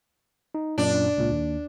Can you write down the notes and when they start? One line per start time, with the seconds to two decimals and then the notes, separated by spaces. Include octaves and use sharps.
0.55 D#4
0.78 F#2 A#2 D4
1.18 C#2 A#2
1.32 D#2